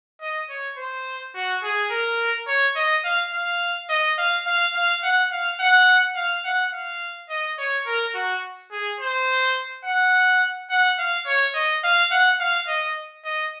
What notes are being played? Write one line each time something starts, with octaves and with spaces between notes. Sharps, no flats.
D#5
C#5
C5
F#4
G#4
A#4
C#5
D#5
F5
F5
D#5
F5
F5
F5
F#5
F5
F#5
F5
F#5
F5
D#5
C#5
A#4
F#4
G#4
C5
F#5
F#5
F5
C#5
D#5
F5
F#5
F5
D#5
D#5